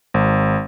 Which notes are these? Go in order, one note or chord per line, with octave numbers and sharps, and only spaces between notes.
G#1